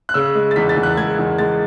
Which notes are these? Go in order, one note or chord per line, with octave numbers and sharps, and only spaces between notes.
F#6
C#3 E6
G#3
A6
E2 B6
A6
E2
F#6
G#3 G#6
E2
G#3 A6